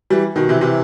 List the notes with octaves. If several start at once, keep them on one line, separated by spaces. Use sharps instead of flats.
E3 G3
B2 D#3
C3 E3
C3 E3